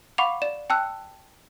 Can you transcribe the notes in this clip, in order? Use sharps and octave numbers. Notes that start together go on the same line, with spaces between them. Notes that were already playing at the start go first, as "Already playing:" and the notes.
F5 F#5 B5 C#6 D6 F7
D5 E7
G5 A5 E6 F#6